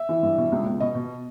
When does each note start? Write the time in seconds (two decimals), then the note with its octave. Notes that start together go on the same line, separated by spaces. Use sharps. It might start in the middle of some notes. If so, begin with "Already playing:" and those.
Already playing: E5
0.09 E3
0.23 G2
0.38 B2
0.52 C#2
0.66 C#2
0.80 B2 D#5
0.95 B2